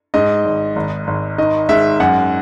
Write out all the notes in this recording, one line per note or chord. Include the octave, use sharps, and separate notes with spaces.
G#2 D#5
G#1
G#1
G#1
D#3 D#5
G#2 E5
F#2 F#5